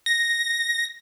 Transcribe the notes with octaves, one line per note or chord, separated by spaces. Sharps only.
A#6